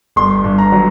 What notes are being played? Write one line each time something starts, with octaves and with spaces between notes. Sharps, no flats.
G1 C6
G2
A#5
F#3